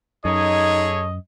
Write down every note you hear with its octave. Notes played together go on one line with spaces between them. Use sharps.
F#2 D#4 G#4 A4 C#5 D#5